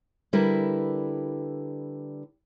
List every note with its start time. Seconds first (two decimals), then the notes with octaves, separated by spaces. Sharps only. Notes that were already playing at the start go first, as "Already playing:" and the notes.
0.33 D3 G3 E4 A#4 B4